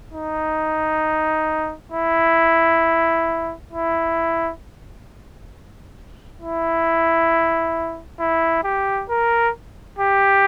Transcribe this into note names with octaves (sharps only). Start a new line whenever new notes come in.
D#4
E4
E4
E4
E4
G4
A#4
G4